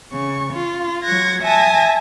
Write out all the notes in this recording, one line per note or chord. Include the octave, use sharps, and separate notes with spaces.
C#3 C#6
F4
F#3 C#6 F#6 G#6 A#6
E5 G#5 A5 D#6 A#6